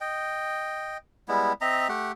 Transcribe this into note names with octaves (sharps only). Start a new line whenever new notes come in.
D#5 G5
G3 G#3 B3 E4
C4 D#5 E5 A#5
A3 G4 F#5